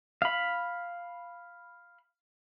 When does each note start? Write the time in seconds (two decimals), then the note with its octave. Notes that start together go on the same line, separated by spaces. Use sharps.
0.22 F5 B5